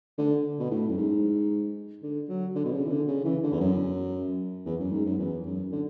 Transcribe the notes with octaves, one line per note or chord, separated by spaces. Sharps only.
D3
B2
A2
F#2
G#2
D3
F#3
D3
B2
C#3
E3
D3
C#3
E3
D3
E2
F#2
E2
F#2
G#2
F#2
E2
F#2
D3